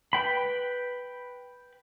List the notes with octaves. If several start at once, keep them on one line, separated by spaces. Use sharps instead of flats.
B4 G5 B5